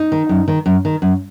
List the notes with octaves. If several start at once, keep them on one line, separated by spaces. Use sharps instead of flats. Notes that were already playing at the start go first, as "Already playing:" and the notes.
Already playing: D#4
D#3
F#2
D#3
F#2
D#3
F#2